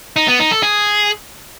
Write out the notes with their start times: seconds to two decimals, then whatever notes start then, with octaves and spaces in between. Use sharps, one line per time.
0.16 D#4
0.28 B3
0.40 D#4
0.51 A4
0.63 G#4